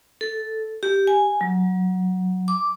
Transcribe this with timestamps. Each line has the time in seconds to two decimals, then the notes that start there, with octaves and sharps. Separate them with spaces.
0.21 A4
0.83 G4
1.07 G#5
1.41 F#3
2.48 D6